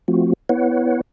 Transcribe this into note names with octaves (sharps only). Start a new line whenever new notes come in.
F3 A3 C4 F4 F#4
B3 E4 B4 C#5 F#5